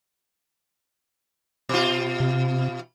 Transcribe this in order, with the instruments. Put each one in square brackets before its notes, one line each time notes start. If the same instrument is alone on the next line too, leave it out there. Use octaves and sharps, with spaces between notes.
[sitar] B2 F4
[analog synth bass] C3